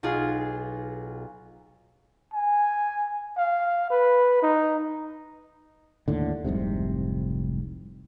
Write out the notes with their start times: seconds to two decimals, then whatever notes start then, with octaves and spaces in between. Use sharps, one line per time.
0.03 B1 F4 G#4
2.34 G#5
3.37 F5
3.90 B4
4.42 D#4
6.08 D#2 A2 D3
6.44 F1 C2 G#2 C3